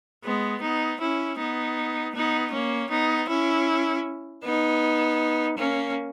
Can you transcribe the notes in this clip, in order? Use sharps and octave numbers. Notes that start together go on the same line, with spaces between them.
G#3 B3
B3 D#4
C#4 E4
B3 D#4
B3 D#4
A#3 C#4
B3 D#4
C#4 E4
B3 D#4
A#3 C#4